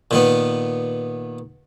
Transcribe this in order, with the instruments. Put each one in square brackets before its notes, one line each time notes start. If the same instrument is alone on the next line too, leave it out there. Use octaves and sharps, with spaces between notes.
[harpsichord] A#2 D#3 B3